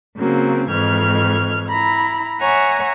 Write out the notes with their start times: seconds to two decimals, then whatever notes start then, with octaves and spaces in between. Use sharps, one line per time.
0.17 C#3 F#3 A#3 C4
0.70 F2 G#2 E3 F6 G#6
1.69 E4 A#5 B5
2.40 C#5 E5 F#5 G#5 A#5